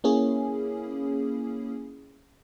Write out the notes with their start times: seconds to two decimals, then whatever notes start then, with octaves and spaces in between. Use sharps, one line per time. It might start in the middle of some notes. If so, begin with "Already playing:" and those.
0.04 A#3 C#4 E4 G#4